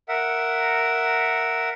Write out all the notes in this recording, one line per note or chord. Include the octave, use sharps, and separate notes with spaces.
A#4 E5 F#5